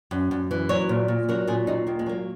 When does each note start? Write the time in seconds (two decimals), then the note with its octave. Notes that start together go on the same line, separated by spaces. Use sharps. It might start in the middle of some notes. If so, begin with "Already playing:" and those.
0.11 F#2
0.31 F#2
0.51 E3
0.69 F#3 C#5
0.89 A#2
1.08 A#2
1.29 F#3 A#4
1.47 A#2 G#4
1.67 A#2 D#4
1.87 D#2 A#3
1.99 G#3
2.06 F#3 A#3